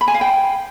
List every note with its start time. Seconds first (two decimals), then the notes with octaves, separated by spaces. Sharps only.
0.01 B5
0.08 G#5
0.14 F5
0.21 G5